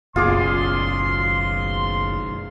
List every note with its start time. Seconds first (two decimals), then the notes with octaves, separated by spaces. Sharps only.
0.16 F#1 B1 F#2 F4 G#4 C6 D6